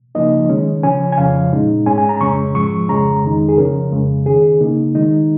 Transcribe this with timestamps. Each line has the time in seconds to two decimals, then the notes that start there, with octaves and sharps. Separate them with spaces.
0.15 C#3 F3 A#3 D#4 D#5
0.49 D#3 G#3 C#4
0.83 C#3 F3 C#4 G#5
1.12 G#5
1.18 F2 C#3 F3 C#4 F5
1.52 A#2 G#3 D#4
1.86 G#2 G#3 C#4 G#5
1.98 G#5
2.09 A#5
2.21 F2 C#3 G#3 C#4 C#6
2.55 G#2 F3 G#3 C#6
2.89 F2 C#3 G#3 C#4 A#5
3.24 F2 D#3 G#3 D#4
3.49 G#4
3.58 C#3 F3 C#4 A#4
3.92 F2 C#3 G#3
4.26 D#3 C#4 G#4
4.60 C#3 A#3 D#4
4.95 D#3 G#3 D#4